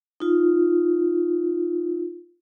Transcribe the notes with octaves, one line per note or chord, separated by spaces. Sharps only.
D#4 F4